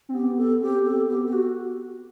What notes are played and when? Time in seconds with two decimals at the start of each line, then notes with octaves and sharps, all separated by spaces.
0.09 C4
0.14 B3 G4
0.38 A4
0.61 C4 G4
0.86 A4
1.09 B3 G4
1.26 G4
1.33 F#4